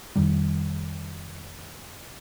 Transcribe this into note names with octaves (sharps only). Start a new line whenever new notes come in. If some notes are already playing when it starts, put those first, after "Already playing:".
F1 F2 D#3 G3